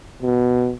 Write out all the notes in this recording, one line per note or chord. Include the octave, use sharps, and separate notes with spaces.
B2